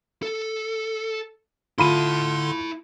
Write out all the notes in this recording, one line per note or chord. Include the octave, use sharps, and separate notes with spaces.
A4
D3 E4 F4 A5 B5 C6 D#7